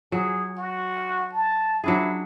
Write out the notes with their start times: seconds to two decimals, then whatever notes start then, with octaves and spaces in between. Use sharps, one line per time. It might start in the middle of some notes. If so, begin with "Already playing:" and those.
0.12 F#3 G#4
0.58 F#4
1.33 A5
1.84 F#3 D4 E4 G#4